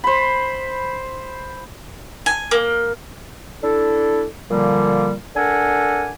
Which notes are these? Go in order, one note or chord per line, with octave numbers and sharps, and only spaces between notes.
C5 B5
G#5
A#3
D4 E4 A4
A#2 D3 F3 G3 A#3
D4 A4 A#4 F#5 G#5